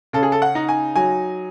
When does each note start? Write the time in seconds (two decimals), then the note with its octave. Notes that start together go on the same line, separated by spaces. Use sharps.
0.13 C#3 A4
0.23 G#4
0.32 A4
0.42 F#5
0.55 D#4
0.69 G#5
0.96 F#3 G#5